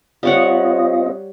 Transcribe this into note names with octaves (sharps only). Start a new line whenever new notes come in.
G3 C4 F4 C#5 D#5 F#5